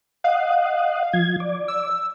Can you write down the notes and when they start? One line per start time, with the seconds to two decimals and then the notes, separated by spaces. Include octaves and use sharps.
0.24 D#5 F5 F#5
1.13 F3 G#6
1.40 D5
1.68 E6